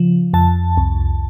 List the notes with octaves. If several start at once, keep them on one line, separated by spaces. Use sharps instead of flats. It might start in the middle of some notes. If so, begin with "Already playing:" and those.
Already playing: C#3 F3
F2 A5
C2